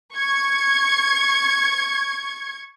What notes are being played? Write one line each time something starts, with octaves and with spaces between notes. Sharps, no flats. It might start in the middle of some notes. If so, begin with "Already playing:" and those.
C#6 G#6